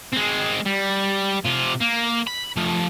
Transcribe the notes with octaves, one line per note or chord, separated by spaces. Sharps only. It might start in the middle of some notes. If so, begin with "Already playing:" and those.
G#3 C4
G3
C3 F4
A#3
B5
F3 A3